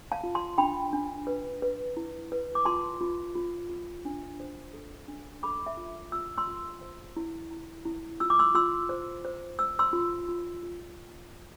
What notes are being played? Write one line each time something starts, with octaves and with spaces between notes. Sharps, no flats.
F5 A5
F4
A5 C6
D4 G5 B5
D4
B4
B4
E4
B4
D6
F4 A5 C6
F4
F4
F4
D4
C5
A4
D4
A4 B5 D6
E5
F4
F4 E6
C6 E6
F4
C5
E4
E4
E4
F4 E6
D6
C6 E6
F4 C6 E6
C5
C5
C5 E6
C6 E6
F4
F4
F4